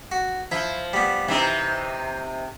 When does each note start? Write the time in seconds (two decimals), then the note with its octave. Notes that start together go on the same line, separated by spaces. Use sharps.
0.12 F#4
0.51 F3 E4
0.93 G3 B3
1.28 C3 E3 C4 D#4